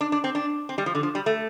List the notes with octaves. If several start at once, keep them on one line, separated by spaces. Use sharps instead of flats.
D4
D4
C4
D4
C4
G3
F3
D3
F3
G3
A3